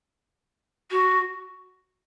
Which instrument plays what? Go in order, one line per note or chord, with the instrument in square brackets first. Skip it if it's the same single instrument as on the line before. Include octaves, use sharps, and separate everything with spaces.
[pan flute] F#4